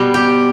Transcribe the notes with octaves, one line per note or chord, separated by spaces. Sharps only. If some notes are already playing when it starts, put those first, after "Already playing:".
Already playing: B2 G3
G4